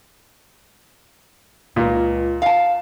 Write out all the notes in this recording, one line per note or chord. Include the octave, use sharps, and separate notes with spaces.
C#2 A#2
F5 A5